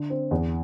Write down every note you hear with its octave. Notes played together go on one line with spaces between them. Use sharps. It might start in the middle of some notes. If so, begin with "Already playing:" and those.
Already playing: D3
C4
E2